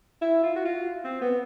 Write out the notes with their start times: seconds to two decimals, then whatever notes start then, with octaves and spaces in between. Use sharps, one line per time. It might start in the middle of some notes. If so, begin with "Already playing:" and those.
0.21 E4
0.43 F4
0.56 F#4
0.65 F4
1.04 C4
1.21 B3